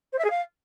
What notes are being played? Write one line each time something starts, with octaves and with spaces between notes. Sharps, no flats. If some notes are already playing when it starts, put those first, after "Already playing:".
C5
E5
G#4
F5